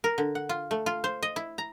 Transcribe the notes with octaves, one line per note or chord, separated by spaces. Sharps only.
A#4
D3
F#5
F4
A3
F4
C5
D#5
E4
A#5